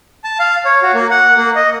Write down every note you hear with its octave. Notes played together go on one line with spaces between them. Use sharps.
A5
F5
C#5
F#4
A#3
F#5
A#3
D#5